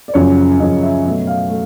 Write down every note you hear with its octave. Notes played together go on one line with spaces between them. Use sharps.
D5
F#2 C#3 F3 C#5
F#2 C#3 F3 D#5
E5
B2 F#3 A3 E5
F5
A3